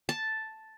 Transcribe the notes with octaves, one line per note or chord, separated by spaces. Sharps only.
A5